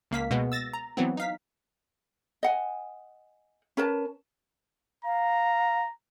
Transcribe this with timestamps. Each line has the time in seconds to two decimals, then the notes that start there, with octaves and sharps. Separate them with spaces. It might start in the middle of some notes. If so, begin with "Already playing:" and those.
0.11 C#2 A#3 F5 B6
0.31 B2 G#3 B3
0.52 E6 A6 A#6
0.73 A#5
0.97 E3 F#3 B3 C4
1.17 D#4 F5 B6
2.43 D#5 F#5 G#5
3.77 C#4 A#4 B4 A5
5.05 F5 A#5